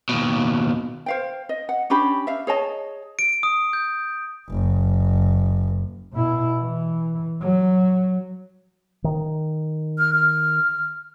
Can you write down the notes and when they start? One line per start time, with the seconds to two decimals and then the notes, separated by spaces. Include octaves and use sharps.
0.09 D#2 B2
1.06 C5 F5 G5
1.49 D#5
1.69 F#5
1.90 C#4 D4 G4 B5
2.27 E5 F5
2.47 G#4 C#5 D#5 A5
3.19 D7
3.43 D#6
3.73 G6
4.50 F#1
6.13 B2 E4
6.60 E3
7.42 F#3
9.04 D#3
9.99 F6
10.14 F6